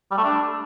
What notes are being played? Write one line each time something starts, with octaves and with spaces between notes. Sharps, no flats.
G3
A3
D4